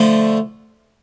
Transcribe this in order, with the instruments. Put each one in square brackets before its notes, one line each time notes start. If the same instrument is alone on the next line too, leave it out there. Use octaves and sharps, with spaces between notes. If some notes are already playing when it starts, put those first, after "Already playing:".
Already playing: [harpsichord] D3 F3 A3 D4 F4